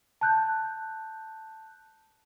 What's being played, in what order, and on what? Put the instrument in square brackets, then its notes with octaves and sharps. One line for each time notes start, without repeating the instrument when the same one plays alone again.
[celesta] A5 F#6 G6